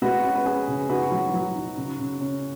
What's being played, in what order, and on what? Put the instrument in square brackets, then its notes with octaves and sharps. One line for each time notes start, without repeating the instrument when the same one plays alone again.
[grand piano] G#3 F#4 B4
C#4
B4
C#4 G#4
C#3
D#4 F#4 B4
F#3
F#3
D#4
C#3
C#3
C#4